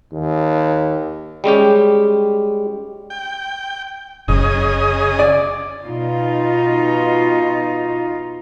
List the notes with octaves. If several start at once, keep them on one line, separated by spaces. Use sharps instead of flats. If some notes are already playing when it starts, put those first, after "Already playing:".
D#2
G3 G#3 C#4 G4
G5
F#1 C#3 G#4 D#5
D5
B2 D#4 F4